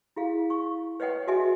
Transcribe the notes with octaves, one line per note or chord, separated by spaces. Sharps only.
E4 G#4 F5
C#6
B4 C#5 D#5 F#5 G5
F#4 G#4 D#5 E5 G#5 D6